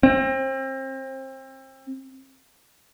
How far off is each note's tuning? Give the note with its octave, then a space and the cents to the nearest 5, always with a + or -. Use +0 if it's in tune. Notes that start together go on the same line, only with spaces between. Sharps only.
C4 +30